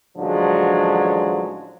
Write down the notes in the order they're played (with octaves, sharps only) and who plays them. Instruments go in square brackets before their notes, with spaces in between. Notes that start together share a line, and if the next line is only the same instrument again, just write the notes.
[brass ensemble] A1 D3 F3 F#3 G#3